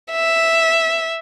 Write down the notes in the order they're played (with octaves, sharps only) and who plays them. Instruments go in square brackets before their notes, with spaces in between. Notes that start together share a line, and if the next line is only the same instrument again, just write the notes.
[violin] E5